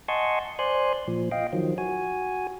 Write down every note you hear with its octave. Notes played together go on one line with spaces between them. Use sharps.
D#5 F#5 G#5 A5 C6 C#6
C5 D5 G#5 C6 F#6
A#2 F3
D#5 F5 G5
D#3 F3 F#3
F#4 G#5